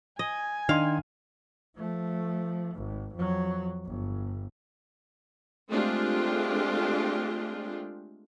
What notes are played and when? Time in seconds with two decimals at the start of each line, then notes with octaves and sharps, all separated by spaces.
0.19 D#5 G#5
0.69 D#3 D4 D#5 F5 C6
1.76 F3 A3
2.75 G#1
3.14 F2 F#3
3.85 G1
5.69 G#3 A3 C4 D4 F4 G4